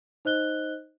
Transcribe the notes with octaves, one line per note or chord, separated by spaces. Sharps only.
D#4 C5 D#5 F#6 G7